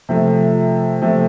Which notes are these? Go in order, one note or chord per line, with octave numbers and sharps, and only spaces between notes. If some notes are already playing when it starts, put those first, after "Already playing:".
C3 F3 A3
C3 F3 A3